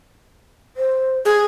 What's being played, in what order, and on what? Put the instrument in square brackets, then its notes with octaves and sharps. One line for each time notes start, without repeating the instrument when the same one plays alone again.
[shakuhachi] C5
[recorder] G#4